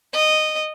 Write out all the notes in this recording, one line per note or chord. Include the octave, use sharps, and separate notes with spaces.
D#5